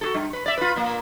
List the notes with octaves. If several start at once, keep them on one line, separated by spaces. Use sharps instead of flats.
F#4 G#4 A4
G2
B4
D5 E5
F4 B4
A#2 A#3